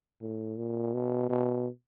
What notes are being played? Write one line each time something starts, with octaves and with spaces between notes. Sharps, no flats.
A2
A#2
B2
B2